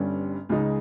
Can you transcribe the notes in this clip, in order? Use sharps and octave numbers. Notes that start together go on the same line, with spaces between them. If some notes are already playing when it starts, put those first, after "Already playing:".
Already playing: G1 G2 G3 C#4
C#2 C#3 G#3 D#4